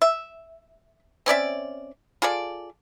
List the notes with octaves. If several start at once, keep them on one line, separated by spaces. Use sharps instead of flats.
E5
C4 C#4 D5 E5
F4 G#4 A4 D5